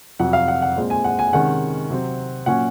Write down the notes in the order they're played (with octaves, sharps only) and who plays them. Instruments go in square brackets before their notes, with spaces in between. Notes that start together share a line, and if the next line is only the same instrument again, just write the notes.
[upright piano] F2 C3 F#3 F#5
F5
F#5
F#5
A#2 G#3 C4
G#5
F#5
G#5
C3 D#3 G#3 C#4 F#5
C3 F#3 C4
A#2 F#3 A#3 C#4 F#5